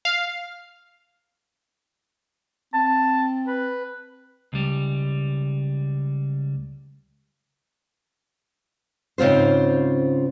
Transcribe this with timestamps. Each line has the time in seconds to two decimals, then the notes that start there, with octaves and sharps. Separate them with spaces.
0.05 F5
2.74 C4 A5
3.47 B4
4.53 C#2 G3
9.18 G#2 C#3 C4 F4 C5